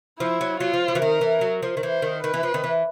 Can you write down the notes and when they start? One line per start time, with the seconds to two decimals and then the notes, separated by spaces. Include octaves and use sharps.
0.20 F3 E4
0.41 F#3
0.60 F#3 F4
0.73 F3
0.88 F3
0.95 E3
1.02 D#3 A#4
1.21 E3
1.41 F#3
1.62 F3
1.77 D#3
1.82 E3 C5
2.02 D#3
2.23 D#3 B4
2.34 E3
2.43 F3
2.54 D#3
2.64 E3